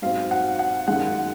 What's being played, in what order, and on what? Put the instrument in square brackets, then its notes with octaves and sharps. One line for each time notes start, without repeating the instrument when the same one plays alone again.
[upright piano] G#2 F#3 C4 F5
F#5
F#5
F#2 D#3 G#3 F#5